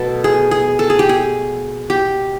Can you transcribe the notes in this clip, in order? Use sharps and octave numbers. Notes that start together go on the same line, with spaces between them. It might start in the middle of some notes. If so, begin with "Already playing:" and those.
Already playing: B2 F#3 A3 A4
G#4
G#4
A4
G#4
G4
G#4
G4